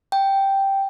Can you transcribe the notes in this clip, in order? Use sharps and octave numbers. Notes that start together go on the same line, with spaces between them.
G5